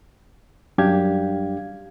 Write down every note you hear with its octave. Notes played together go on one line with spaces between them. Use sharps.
F#2 G3 D4 G4 F5 G#6